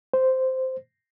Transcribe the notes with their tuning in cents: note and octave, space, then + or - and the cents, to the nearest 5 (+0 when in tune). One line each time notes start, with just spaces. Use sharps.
C5 -5